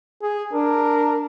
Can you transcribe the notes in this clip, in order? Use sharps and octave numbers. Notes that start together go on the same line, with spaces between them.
G#4
D4 A#4